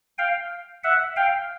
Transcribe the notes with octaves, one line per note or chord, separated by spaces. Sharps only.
F5 G5
E5 F#5
F5 G5